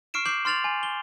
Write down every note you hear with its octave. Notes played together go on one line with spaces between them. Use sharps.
C#6 F6 C7 D7 E7
D6 G6 C7 F#7
C6 F6 A6 F7 F#7
G#5
G7